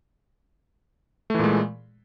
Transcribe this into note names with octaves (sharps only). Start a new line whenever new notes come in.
A#2 E3 G#3 A3